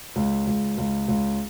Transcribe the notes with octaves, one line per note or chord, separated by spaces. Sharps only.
C#2
C#2
C#2
C#2